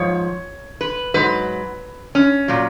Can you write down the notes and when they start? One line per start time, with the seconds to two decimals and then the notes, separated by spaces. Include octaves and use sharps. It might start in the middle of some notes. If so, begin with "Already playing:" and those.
Already playing: G#2 F3 C#5
0.81 B4
1.14 G#2 F#3 B4
2.15 C#4
2.48 A#2 F#3